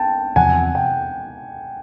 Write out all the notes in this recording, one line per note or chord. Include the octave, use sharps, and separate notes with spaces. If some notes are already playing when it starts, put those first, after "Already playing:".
Already playing: G5 A5
E2 C3 F3 F#5 G#5
G5